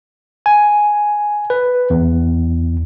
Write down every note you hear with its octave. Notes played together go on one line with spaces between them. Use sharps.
G#5
B4
E2